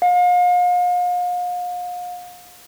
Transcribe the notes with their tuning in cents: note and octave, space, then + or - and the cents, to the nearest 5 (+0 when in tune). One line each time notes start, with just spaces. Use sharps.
F5 +40